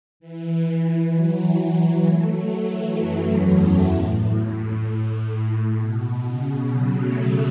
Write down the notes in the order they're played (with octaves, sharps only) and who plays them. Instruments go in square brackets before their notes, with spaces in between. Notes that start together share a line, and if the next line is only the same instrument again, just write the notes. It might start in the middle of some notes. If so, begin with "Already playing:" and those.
[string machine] E3
F#3
A3
F#3
E3
F#2
E2
F#2
A2
B2
C#3
F#3
A3